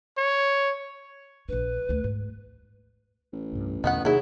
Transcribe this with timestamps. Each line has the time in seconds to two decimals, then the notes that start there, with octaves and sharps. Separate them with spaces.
0.17 C#5
1.49 A#1 D4 B4
1.89 D2 A3
2.04 G#2
3.32 A1
3.52 C2 G2
3.84 E2 B2 D3 D#3 B3 F#5
4.05 D#2 C3 F#3 A#3 E4 G#4